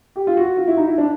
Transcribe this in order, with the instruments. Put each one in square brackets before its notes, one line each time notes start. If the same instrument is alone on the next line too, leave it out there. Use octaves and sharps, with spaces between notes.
[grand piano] G4
F4
F#4
F4
E4
D#4
E4
D4